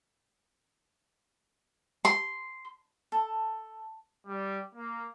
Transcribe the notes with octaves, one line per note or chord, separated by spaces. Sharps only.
C6
A4
G3
A#3